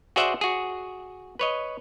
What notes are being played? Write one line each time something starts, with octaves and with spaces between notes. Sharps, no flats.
F#4 G#4 C5 D5 E5 F#5
F#4 G#4
B4 C#5 D#5